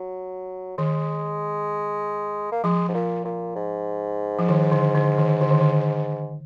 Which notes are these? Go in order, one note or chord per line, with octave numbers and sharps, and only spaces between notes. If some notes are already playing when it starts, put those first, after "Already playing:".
Already playing: F#3
D#3 G#3
A#3
F3 G#3
G#2
A#2
A#2
G#2
F3
D#3
D3
D3
D#3
D3
D#3
D3